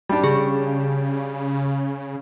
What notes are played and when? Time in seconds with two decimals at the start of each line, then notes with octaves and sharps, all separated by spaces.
0.09 G3 D4
0.24 C#3 G#4